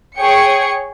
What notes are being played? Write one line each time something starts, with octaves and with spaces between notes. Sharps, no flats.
G#4 C#5 G5 C#7